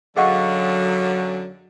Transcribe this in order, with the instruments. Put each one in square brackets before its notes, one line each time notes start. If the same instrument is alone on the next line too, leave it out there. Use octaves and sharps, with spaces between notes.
[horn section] F#2 D3 [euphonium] F#3 [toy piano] G#4 D#5 F#5 [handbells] F5 C#6